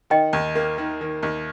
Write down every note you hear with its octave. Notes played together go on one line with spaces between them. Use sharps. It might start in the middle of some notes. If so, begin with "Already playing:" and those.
D#3 D#5 G5
D#2
A#3
D#3
D#3
D#2